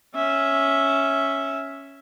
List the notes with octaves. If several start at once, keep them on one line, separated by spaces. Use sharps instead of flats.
C#4 E5